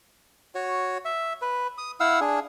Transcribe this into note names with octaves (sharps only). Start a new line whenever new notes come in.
F#4 C#5
E5
B4
D#6
E4 F5 F#5 E6
D4 G#4